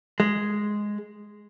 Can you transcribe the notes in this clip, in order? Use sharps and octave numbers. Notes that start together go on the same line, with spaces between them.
G#3